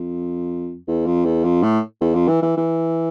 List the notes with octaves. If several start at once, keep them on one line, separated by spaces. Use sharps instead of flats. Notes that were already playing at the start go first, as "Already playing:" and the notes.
Already playing: F2
E2
F2
E2
F2
A2
E2
F2
E3
E3
E3